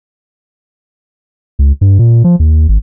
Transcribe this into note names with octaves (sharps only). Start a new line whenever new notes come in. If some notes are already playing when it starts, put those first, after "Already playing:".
C#2
G2
A#2
F3
D#2
G#1